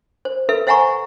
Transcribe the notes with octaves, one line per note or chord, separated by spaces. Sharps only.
C5
A4 B4 E5
C5 E5 F#5 G#5 A#5 C#6